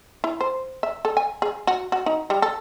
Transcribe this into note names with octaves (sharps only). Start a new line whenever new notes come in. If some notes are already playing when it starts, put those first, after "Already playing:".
E4
C5
E5
A4
G#5
G#4
F#4
F#4
D#4
G3
A4